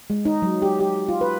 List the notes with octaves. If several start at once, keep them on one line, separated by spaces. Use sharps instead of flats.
G#3
D#4
F#3
G4
G4
F4
B4